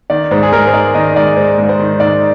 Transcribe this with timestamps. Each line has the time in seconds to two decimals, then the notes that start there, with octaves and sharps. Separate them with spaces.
0.10 D#3 D5
0.31 G#2 C5
0.43 G#4
0.53 G#2 A#4
0.67 C5
0.73 G#3 D5
0.94 D#3 D#5
1.16 G#2 D5
1.37 G#2 C5
1.58 G#2
1.69 C5
1.79 D#3
2.00 G#2 D5